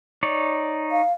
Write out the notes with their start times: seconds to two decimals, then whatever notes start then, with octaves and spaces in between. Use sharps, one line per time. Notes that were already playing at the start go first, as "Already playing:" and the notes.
0.23 D#4 C#5 D5
0.91 F5